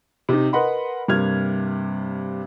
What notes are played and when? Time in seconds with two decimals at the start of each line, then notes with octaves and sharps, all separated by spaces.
0.29 C3 D#4
0.53 A#4 B4 D#5 F#5 B5 C6
1.08 G2 C3 A#3 F6 G#6 F7